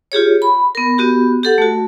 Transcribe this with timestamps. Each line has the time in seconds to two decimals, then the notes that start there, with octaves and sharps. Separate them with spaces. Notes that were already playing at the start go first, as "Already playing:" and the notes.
0.12 F4 G4 G#4 C#5
0.42 B5
0.75 B3 A#4
0.98 B3 F#4 G4
1.43 G4 A4 F#5
1.58 A3 F#4